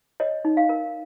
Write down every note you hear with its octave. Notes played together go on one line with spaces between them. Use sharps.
C#5 D#5
D#4
F5
A#4